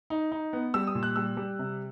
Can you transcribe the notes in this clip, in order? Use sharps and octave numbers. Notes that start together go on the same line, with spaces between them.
D#4
D#4
B3
G3 E6
D#6
A#2
F#6
G3 E6
G3
C3